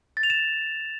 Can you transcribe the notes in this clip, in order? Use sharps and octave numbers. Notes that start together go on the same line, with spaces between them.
A6
F7
E7